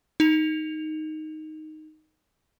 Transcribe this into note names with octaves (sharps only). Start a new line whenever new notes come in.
D#4 F7